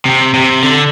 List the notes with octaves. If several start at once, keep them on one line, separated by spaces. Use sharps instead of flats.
C3
C3
D3